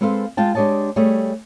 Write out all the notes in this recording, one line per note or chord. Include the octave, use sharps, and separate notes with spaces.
G#3 C4 A4 B4 C5 F5
G#3 F4 G5 A5
G#3 D4 G4 C#5 D#5 A5
G3 A3 G#4 C#5